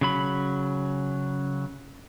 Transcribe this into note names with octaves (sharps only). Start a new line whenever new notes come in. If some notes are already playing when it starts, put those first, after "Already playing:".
C#3 F#3 B5